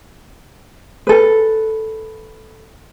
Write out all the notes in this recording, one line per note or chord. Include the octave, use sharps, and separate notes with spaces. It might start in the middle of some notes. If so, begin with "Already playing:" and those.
A4 B4